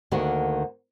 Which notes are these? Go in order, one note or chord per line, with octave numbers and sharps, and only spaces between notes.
D2 D3 D#3 A#3 F#4 F#5